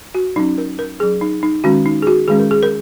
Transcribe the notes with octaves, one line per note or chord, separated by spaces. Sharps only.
F#4
F#3 C#4 D#4
A#4
A#4
F#3 C#4 G#4
D#4
D#4
D#3 G#3 C#4 F#4
D#4
G#4
F#4
D#3 G#3 C#4 G#4
A#4
G#4
A#4